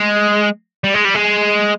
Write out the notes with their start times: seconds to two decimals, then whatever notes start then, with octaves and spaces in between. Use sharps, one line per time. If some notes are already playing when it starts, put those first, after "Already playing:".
Already playing: G#3
0.84 G3
0.94 G#3
1.05 G3
1.14 G#3